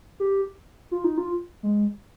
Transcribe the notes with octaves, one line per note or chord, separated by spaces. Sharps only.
G4
F4
D#4
F4
G#3